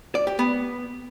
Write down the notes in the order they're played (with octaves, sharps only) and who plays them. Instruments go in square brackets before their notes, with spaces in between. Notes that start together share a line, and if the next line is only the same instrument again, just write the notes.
[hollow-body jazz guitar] D5
G4
B3